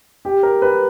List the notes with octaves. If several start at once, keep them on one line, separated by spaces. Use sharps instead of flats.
G4
A#4
B4